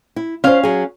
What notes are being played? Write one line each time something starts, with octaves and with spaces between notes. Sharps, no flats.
E4
C#4 F4 C5 F5
F#3 G#4